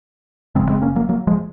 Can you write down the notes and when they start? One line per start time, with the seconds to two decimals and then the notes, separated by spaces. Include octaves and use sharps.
0.55 F#1 F2 C#3 G#3 C4
0.69 G#3 C4
0.82 A#3 C#4
0.96 F#3 A#3
1.09 F#3 A#3
1.27 F3 G#3